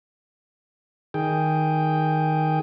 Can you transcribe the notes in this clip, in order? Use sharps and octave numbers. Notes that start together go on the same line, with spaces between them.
D#3 G#4 G5